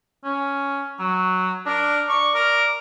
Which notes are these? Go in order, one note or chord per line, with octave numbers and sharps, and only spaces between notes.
C#4
F#3
D4 A#4
D5 C#6
A#4